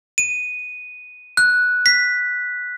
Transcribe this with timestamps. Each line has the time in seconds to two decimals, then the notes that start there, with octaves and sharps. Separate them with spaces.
0.18 D#7
1.37 F#6
1.86 B6